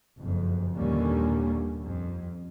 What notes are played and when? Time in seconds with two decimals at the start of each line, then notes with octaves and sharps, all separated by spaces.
0.20 F#1 F2
0.75 D#2 A#2 D3 G3 A#3 C#4
1.84 F2